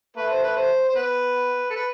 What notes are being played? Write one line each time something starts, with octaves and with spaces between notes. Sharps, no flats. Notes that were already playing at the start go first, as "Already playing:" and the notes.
A3 B4
C5
B4
C5
C5
B3 B4
A4
B4